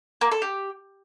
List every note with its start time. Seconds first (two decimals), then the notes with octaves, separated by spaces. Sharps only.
0.21 A#3
0.32 A4
0.42 G4